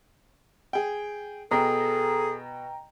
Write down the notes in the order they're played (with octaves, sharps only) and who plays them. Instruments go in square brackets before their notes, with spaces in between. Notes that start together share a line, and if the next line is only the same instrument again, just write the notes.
[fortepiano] G#4 G5
[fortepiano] B2 [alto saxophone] G#4 [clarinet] A4 [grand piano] G5 A#5